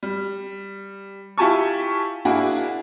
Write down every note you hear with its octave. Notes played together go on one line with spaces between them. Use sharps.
G3
E4 F4 G4 G#5 A5 C#6
A#3 D4 E4 F#4 G#4